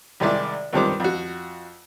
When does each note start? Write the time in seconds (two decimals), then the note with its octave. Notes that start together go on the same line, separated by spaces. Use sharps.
0.20 C2 D#3 G#3 D5 E5
0.73 C#2 G2 C3 D#3 C5 D6
1.00 F2 F#4